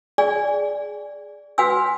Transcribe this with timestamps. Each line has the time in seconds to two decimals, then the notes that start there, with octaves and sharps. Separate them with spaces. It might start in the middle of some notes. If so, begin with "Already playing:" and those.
0.18 G#4 D5 G#5
1.58 F#4 B4 F#5 G#5 E6